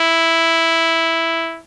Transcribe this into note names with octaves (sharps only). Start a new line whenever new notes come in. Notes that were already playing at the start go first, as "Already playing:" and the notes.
Already playing: E4